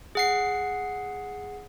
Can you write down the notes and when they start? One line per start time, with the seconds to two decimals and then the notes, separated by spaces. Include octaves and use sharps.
0.15 G#4 F#5 C7